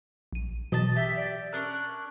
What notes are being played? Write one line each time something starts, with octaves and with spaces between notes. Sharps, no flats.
A#1 D#7
B2 E3 F#3 D#5 A5
G4 E5
D5
C#4 D4 A#4 E6 F#6